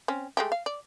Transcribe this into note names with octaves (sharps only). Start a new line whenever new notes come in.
C4 C#4
G#3 A3 G4
F5
D5